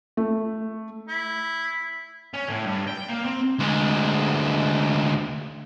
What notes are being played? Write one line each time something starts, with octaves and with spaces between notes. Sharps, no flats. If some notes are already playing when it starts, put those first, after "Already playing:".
A3
E4
C#4
A2
G2
G5
A#3
C4
D2 G#3